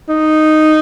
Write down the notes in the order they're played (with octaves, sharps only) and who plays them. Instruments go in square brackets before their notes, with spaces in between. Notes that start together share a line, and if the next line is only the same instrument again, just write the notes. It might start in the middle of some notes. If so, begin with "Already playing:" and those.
[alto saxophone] D#4